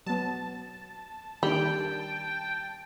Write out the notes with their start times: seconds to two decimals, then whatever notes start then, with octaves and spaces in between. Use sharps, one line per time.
0.06 F#3 B3 A5
1.43 D#3 G3 D4 G5